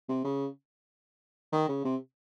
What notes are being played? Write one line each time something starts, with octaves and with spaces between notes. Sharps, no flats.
C3
C#3
D#3
C#3
C3